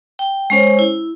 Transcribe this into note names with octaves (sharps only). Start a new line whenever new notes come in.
G5
G#3 C#4 C5 C#5
E4